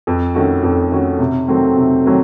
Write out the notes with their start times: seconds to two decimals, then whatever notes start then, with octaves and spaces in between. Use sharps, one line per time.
0.07 F2
0.34 D#3 A3 C#4 F#4
0.63 F2
0.91 D#3 A3 C#4 F#4
1.19 C3
1.48 D#3 F#3 A3 C4
1.75 C3
2.04 D#3 F#3 A3 C4